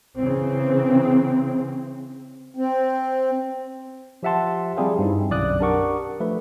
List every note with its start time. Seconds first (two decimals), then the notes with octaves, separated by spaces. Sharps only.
0.18 C#3 E3 C4
2.57 C4
4.23 F3 G4 E5 F#5 A5 C6
4.77 F3 G3 C4 G#4 C5 F5
4.99 G2 C4 D#4 E4
5.30 B1 F#2 D3 D5 D#6 F#6
5.60 D4 G4 A#4 F#5 C#6 D6
6.20 F3 A3 B4